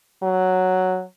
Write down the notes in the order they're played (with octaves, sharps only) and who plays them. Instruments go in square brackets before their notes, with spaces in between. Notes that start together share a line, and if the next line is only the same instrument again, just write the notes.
[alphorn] F#3